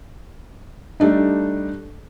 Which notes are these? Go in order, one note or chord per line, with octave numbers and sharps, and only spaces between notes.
G3 A3 D4 D#4